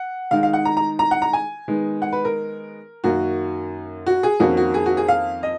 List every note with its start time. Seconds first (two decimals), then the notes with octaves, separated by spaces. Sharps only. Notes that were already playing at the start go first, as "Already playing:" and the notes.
Already playing: F#5
0.31 D#3 G#3 D#4 F5
0.43 F5
0.53 F#5
0.65 A#5
0.77 A#5
0.99 A#5
1.11 F#5
1.22 A#5
1.33 G#5
1.68 D#3 G#3 B3 D#4
2.02 F#5
2.13 B4
2.25 A#4
3.04 F#2 D#3 A#3 F#4
4.06 F#4
4.23 G#4
4.40 F2 D#3 A#3 C#4 F#4
4.57 F#4
4.74 G#4
4.86 F#4
4.97 G#4
5.08 F5
5.43 D#5